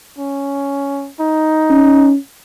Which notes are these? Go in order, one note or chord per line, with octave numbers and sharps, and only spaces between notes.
C#4
D#4
C#4